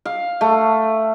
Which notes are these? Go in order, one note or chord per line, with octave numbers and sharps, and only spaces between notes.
F5
A3